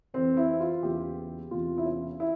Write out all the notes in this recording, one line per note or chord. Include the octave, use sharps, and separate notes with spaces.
F2 E3 C4
E4
F4
E2 C#3 E3 G4
E2 C3 E3 F4
E4
C#4
E4